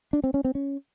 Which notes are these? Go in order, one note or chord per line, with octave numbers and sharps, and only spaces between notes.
D4
C4
C#4
C4
C#4